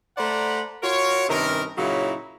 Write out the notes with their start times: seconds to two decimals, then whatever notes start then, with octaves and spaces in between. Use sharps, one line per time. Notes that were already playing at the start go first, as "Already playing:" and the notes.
0.17 A3 C5 D5 F#5 A#5 B5
0.83 F4 F#4 A#4 C#5
1.29 G2 C3 D#3 C#4 A#4
1.78 A#2 C#3 F#3 D#4 E4